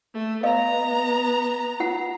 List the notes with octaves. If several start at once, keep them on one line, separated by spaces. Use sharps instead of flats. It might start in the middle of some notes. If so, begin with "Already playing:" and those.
A3
B3 D#5 F5 A#5
F4 F#5